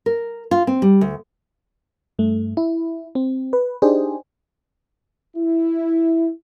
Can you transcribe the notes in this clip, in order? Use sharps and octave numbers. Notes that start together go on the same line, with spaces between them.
A#4
F4
C4
G3
D2
G2 A3
E4
C4
B4
D4 D#4 G4 G#4 C5
E4